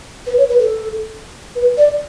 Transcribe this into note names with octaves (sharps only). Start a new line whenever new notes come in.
B4
C#5
B4
A4
B4
D5